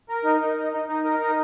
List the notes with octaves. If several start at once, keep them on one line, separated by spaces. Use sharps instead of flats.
A#4
D#4
D#4
D#4
D#4
D#4
A#4
D#4